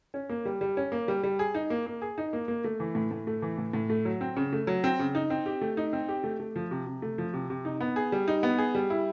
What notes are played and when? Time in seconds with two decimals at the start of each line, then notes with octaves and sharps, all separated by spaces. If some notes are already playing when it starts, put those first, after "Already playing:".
0.14 C#4
0.30 A#3
0.45 G3
0.61 G3
0.77 C#4
0.92 A#3
1.08 G3
1.23 G3
1.39 G#4
1.55 D#4
1.70 A#3
1.86 A#3
2.02 G#4
2.18 D#4
2.33 A#3
2.48 A#3
2.64 A3
2.80 E3
2.95 A2
3.11 A2
3.27 A3
3.42 E3
3.58 A2
3.73 A2
3.90 A3
4.05 F#3
4.21 C4
4.36 C#3
4.53 A3
4.67 F#3
4.84 C4
4.99 C#3
5.15 D#4
5.30 C4
5.46 G4
5.61 A3
5.77 D#4
5.93 C4
6.08 G4
6.24 A3
6.40 A3
6.56 F3
6.71 C3
6.86 C3
7.02 A3
7.18 F3
7.34 C3
7.50 C3
7.65 D#4
7.81 B3
7.96 G#4
8.12 G3
8.28 D#4
8.43 B3
8.58 G#4
8.75 G3
8.90 E4